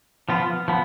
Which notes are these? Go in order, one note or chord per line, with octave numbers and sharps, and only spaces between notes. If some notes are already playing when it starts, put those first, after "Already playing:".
F3 B3 F4
F3 B3